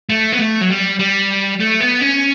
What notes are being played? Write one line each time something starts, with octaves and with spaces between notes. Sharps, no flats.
A3
B3
A3
F#3
G3
G3
A3
B3
C#4